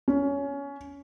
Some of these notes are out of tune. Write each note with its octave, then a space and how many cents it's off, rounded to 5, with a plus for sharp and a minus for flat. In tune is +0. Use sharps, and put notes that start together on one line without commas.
C#4 +20